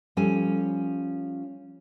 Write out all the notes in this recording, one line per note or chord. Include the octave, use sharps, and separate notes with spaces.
F3 G3 C#4 A4 G#5